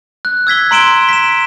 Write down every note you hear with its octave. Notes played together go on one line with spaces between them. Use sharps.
F#6
E6 G#6 B6 G7
A#5 C6 D7 E7 G7
B6 E7